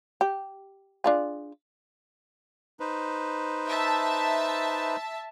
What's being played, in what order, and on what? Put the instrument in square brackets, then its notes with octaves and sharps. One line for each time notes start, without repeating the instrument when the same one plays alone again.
[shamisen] G4
D4 F4 G#4
[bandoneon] D#4 B4 C5
[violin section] E5 A5